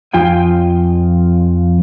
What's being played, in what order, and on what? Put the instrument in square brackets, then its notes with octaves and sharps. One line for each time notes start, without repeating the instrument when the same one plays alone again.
[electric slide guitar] F2 F4 G5 G#5